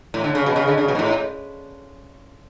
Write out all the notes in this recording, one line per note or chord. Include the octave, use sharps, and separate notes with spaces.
A2
D3
C#3
B2
C#3
D3
C#3
B2
G#2
A2